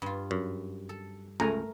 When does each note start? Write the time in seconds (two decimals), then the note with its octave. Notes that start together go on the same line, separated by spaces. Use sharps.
0.02 G2 F4
0.31 F#2
0.89 A4
1.40 C#2 A3 A#4 G#5 A#5